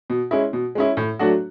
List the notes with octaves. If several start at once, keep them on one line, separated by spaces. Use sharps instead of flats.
B2
G#3 C#4 E4
B2
G#3 C#4 E4
A2
F#3 A3 D4 F#4